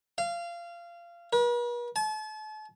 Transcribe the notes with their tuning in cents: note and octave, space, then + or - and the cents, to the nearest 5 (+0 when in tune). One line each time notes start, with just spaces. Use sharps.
F5 -25
B4 -45
A5 -40